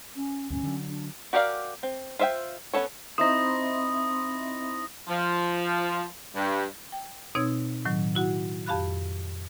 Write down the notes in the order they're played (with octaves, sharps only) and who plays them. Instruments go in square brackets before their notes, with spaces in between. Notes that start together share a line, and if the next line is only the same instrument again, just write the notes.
[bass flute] C#4
[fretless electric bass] D2 G2 A#2 [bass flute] C#4
[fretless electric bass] D3 F#3
[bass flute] D4
[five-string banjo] F#4 G4 A#4 D5 F5
C4
F4 C5 E5 F5 G5
B3 C#4 A4 C#5
[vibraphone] C4 E5 B5 [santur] D#4 E4 C5 [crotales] D#6 A#6
[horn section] F3
G2
[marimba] G5
B2 C4 D#4 C#5 E6 G#6
A2 D#3 F#3
E4 F#4 F#5
F2 G4 F5 B5 F#6